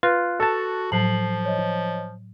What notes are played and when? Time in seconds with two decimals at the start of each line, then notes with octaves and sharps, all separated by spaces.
0.03 F4 B4 F#6
0.40 F#4 A4 A5
0.92 A2 F3 F#3 C7 F#7
1.45 C#5 D#5